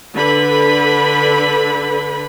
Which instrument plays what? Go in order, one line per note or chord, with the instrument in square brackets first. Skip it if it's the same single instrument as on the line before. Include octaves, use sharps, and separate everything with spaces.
[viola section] D3 B4 B5